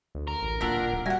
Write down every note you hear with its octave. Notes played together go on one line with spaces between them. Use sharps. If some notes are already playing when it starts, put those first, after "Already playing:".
D2
A#4
A1
D1 A#2 D4 F#5 E6 B6
D1
G3 F#4 E5 F#5 G#5 A#6